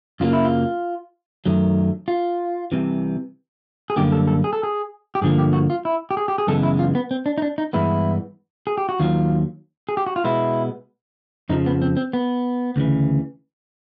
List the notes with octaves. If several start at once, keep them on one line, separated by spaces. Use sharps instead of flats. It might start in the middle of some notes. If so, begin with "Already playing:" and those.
F#2 C#3 F#3 A#3 F4
E4
F4
F#2 D#3 F#3 A3
F4
C2 C3 E3
G#4
F#2 D3 G3 A#3 G4
A4
A4
G#4
A4
G#4
G4
G2 D3 F3 A#3 G#4
G4
F#4
F4
E4
G4
G#4
G4
G#4
F#2 C#3 E3 G#3 B3 A4
E4
F4
B3
C4
D4
D#4
D4
D#4
G2 E3 G#3 B3 E4
G#4
G4
F#4
D#2 D#3 F#3 F4
G#4
G4
F#4
F4
B2 G#3 B3 E4
F2 C#3 F3 D#4
B3
C4
C4
B3
D2 C#3 E3